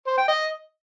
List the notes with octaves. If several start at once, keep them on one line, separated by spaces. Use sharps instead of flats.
C5
G5
D#5